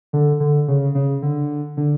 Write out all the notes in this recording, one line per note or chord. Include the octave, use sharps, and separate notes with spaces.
D3
D3
C#3
C#3
D3
D3